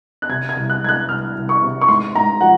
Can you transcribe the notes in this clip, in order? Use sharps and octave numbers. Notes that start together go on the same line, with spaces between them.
F#6
C3 G#6
G#6
C2
F#6
G#3 G#6
F#6
C2 F6
C2
C#6
C3
C#6
G#2 C6
G#2 A#5
F3 F#5